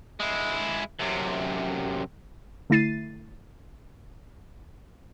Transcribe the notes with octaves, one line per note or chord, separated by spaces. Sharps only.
G#3 E4
F#2 C3
D3 A3 E4 A6 C7 D#7